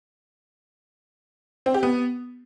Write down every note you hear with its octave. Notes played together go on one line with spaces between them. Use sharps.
C4
G4
B3